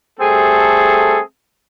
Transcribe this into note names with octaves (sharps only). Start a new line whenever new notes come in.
G3 A3 C4 G#4 A4